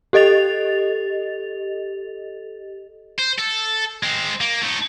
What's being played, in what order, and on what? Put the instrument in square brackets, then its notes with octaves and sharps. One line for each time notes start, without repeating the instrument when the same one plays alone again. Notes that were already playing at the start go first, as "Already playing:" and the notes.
[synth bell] G4 A4 D#5 A6 F7
[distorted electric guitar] C5
A4
G#3 C4
A#3
A3 D#4